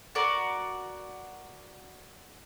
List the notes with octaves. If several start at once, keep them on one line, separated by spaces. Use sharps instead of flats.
F#4 A#4 D5